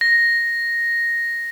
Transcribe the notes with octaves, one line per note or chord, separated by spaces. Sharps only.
A#6